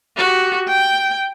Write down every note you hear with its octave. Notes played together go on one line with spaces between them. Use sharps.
F#4 G4
G5